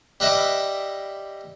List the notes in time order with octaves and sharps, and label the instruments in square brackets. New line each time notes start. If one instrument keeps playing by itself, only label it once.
[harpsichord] G3 B4 D#5 E5 B5 D6